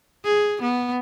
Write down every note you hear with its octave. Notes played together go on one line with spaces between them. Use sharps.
G#4
B3